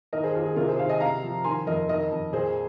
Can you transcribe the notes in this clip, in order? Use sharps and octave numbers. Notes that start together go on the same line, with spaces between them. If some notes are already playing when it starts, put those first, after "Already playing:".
D#3 A#4 D#5
G#4 C5
D#2 F4 A#4
G#4
C3 F4 A#4
G#4 C5
D#3 C5 F5
D#5 G#5
C3 F5 A#5
F3
D#3 G#5 C6
F2 A#4 D#5
D#3 A#4 D#5
F2
A#2 G#4 C5